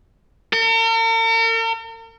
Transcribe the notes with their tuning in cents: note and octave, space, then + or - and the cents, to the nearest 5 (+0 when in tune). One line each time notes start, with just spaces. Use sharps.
A#4 -45